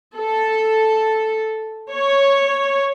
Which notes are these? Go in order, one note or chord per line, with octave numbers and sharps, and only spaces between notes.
A4
C#5